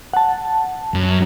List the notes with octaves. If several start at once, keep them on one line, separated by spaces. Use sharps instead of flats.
F#5 A5
F#2